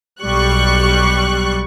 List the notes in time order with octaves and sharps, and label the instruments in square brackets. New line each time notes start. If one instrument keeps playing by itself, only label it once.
[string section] B1 G3 C#6 F#6